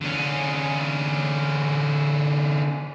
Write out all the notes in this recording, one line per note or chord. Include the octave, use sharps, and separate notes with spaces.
D3 C#4